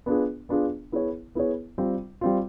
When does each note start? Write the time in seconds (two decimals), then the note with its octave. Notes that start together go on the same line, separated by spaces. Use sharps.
0.06 B3 D4 F4 G#4
0.49 B3 D4 F4 G#4
0.92 B3 E4 G#4 C#5
1.35 B3 E4 G#4 C#5
1.78 G3 C4 F4
2.21 G3 C4 F4